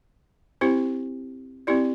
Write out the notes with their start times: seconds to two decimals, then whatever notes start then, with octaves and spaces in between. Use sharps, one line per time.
0.61 C4 E4 G4 C5
1.67 C4 E4 G4 D5